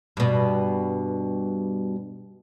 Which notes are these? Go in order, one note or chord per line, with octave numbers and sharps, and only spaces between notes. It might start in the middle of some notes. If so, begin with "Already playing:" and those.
G2 B2